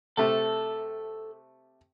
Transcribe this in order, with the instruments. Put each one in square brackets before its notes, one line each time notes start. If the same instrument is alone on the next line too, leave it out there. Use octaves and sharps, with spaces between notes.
[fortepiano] C3 A3 [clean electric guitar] A4